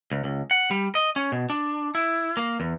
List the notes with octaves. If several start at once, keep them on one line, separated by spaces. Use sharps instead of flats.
C#2
C#2
F#5
G3
D#5
C#4
B2
D4
E4
A#3
E2